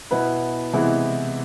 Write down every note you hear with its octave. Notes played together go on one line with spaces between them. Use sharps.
B2 B3 E4 B4
C3 E3 G#3 B3 E4